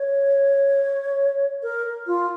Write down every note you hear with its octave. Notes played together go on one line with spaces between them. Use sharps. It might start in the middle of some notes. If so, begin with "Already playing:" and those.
Already playing: C#5
A#4
F4